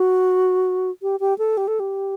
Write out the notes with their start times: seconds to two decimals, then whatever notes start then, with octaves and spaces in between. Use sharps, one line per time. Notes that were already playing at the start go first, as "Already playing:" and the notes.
Already playing: F#4
1.02 G4
1.20 G4
1.38 A4
1.57 G4
1.68 A4
1.80 G4